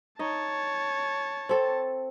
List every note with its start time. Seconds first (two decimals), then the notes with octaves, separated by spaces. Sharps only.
0.19 D#4 C#5 D#5 A5
1.49 C4 A4